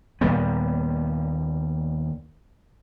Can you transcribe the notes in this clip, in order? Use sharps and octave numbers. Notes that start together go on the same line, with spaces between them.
D#2 A#2 G3 B3